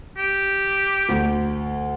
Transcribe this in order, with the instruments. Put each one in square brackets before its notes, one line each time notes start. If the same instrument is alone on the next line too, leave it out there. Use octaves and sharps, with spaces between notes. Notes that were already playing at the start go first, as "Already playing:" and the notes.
[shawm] G4
[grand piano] D2